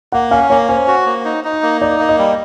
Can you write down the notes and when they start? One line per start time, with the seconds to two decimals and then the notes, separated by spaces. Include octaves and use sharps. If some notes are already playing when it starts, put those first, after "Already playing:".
0.12 A#3 F#5
0.31 C#4 F5
0.50 A#3 C#5
0.69 C#4 C5
0.87 F#4
1.06 A#3
1.25 D#4
1.44 D#4
1.63 A#3
1.81 D#4 D5
2.00 A#3
2.09 D#5
2.18 G3